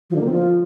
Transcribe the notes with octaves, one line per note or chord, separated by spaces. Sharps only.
F3
D3
A#3
C4
F3